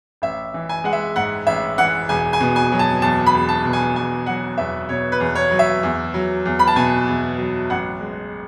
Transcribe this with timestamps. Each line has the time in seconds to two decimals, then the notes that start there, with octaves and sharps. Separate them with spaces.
0.22 A1 E5
0.54 E3
0.69 G#5
0.84 G#3 F#5
0.93 E5
1.16 G#2 F#5
1.47 A1 E5
1.78 E3 F#5
2.09 E1 G#5
2.33 G#5
2.40 B2
2.56 G#5
2.72 F#3
2.79 A5
3.02 E2 A5
3.26 B5
3.34 E1
3.49 A5
3.65 B2
3.73 G#5
3.96 E2 G#5
4.26 F#3 F#5
4.58 E2 E5
4.89 B2 C#5
5.12 B4
5.20 E2
5.35 C#5
5.51 F#3
5.59 E5
5.83 E2
6.14 F#3
6.46 E2
6.59 B5
6.67 A5
6.76 B2 G#5
7.07 E2
7.38 F#3
7.70 A1 F#5
8.01 G#3